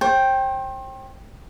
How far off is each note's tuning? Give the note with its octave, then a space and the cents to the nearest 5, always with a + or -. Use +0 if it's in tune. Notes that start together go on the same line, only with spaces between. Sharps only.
C5 +40 G5 +0